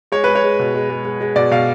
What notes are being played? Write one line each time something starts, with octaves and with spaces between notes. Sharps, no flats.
G#3 C#5
G#3 B4
C#5
G#3
B2
G#3
G#3
G#3
G#3
B2 D5
B2 F5